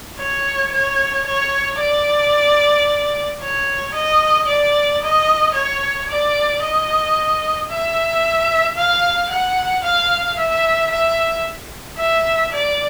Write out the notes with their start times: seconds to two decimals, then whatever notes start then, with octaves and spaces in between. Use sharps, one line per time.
0.18 C#5
0.72 C#5
1.26 C#5
1.80 D5
3.41 C#5
3.94 D#5
4.48 D5
5.02 D#5
5.54 C#5
6.09 D5
6.62 D#5
7.70 E5
8.76 F5
9.30 F#5
9.83 F5
10.37 E5
10.91 E5
11.97 E5
12.52 D5